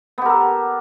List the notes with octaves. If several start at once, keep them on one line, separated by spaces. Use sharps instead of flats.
B3 G4 A4 A#4